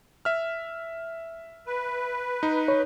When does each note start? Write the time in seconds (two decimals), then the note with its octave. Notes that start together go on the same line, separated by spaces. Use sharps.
0.25 E5 F6
1.67 B4
2.43 D#4
2.68 C#5